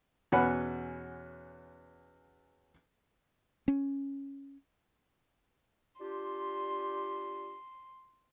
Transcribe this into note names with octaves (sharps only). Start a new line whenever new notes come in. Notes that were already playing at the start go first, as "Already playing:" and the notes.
E2 B2 C#4 F#5 G#5 B5
C#4
D4 F4 G4 C6